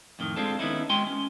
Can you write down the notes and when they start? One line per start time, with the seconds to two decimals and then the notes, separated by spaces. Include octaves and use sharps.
0.19 F2 A2 D#3
0.36 G#3 C4 D4 F4 A4
0.59 D#3 B3 C#4 D#4 E4
0.90 G#3 F#4 G5 G#5 C6
1.07 C#4